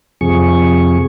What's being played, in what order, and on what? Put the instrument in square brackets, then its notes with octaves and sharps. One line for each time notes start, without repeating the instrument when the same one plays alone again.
[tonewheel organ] F2 C3 F3 G#4 C#6